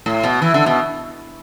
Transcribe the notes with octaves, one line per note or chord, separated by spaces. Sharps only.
A2
B2
E3
D3
B2